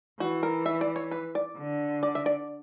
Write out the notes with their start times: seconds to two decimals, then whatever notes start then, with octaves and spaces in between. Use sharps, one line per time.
0.20 E3 F#4
0.43 A#4
0.66 E5
0.81 D5
0.96 C#5
1.11 B4
1.35 D5
1.57 D3
2.03 D5
2.15 E5
2.26 D5